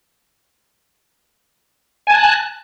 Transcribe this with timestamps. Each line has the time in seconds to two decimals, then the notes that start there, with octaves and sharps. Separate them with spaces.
2.07 G#5
2.10 A5
2.14 F#6